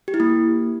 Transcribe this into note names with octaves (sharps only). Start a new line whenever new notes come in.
G4
E4
A#3